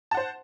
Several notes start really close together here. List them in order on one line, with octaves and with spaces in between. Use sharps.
A5 F#5 C5